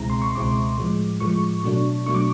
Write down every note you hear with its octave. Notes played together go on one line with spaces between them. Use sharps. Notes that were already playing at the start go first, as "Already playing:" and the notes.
Already playing: C#2 B2 G#3 C4 E4 A#5
C6
C#6
C#2 B2 G#3 C4 E4 D6
A2 F3 G#3
A2 F3 G#3 C#6
B2 F#3 A3 D4
B2 F#3 A3 D4 C#6
D6